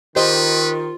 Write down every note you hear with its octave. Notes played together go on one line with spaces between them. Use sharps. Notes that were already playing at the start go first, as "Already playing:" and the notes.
D#3 F4 G4 B4 C5 D#5